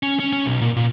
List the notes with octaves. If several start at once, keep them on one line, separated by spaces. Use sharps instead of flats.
C#4
C#4
C#4
B1
A#2
A#2